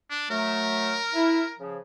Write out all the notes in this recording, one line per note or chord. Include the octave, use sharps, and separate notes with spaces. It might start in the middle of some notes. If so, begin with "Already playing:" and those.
D4
F#3 A3 A#4
E4
C#3 F3